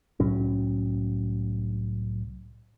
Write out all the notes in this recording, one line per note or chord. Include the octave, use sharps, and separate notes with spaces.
C2 A2 F#3 C#4